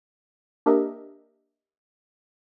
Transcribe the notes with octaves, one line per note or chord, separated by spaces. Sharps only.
A#3 D4 G4 A#4 D#5 E5